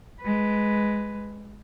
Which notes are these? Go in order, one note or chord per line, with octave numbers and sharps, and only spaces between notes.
G#3 B4